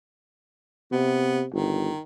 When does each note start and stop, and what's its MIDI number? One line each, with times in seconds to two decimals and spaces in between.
0.92 1.47 48
0.92 1.43 59
1.52 1.90 31
1.52 2.00 51